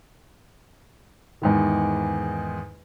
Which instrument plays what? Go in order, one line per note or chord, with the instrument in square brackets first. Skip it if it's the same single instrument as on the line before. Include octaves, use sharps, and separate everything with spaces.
[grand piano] E2 G#2 D#3